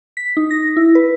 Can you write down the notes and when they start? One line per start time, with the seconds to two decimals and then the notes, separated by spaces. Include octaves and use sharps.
0.17 B6
0.37 D#4
0.51 A#6
0.76 E4
0.95 B4